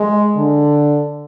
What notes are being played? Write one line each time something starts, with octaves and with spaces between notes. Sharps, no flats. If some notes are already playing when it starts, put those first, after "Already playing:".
Already playing: G#3
D3